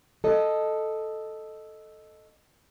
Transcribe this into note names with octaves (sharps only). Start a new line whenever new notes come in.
A4 D#5